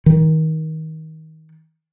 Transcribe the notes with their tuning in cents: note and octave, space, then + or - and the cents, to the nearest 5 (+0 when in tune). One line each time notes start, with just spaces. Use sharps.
D#3 +25